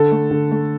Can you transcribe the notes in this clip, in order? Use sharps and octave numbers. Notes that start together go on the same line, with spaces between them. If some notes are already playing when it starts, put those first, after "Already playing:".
Already playing: D3 A4
A3
D3
A3